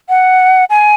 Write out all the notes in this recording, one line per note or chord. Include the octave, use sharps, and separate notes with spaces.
F#5
G#5